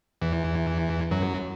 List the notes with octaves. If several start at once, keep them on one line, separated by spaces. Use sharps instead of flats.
E2 E3
F#2 F#3